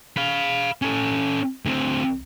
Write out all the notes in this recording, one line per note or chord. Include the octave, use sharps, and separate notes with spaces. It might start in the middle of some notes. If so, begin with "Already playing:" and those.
F5 B5
C#4 A4
D2 C4